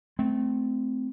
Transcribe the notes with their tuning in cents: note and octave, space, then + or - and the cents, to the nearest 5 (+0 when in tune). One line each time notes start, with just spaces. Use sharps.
A3 -20 C4 -20